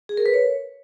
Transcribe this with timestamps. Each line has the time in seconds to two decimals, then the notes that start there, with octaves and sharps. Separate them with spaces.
0.09 G#4
0.17 A#4
0.26 B4
0.34 C#5